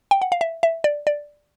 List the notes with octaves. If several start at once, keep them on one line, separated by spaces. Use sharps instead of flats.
G5
F#5
F5
E5
E5
D5
D5